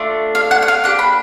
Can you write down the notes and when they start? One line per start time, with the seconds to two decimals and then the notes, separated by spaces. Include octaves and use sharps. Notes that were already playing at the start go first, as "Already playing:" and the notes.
Already playing: A3 D4 F4
0.35 F5
0.51 F#5
0.62 F#5
0.68 F5
0.84 A#3 D4 G4 F#5
0.99 B5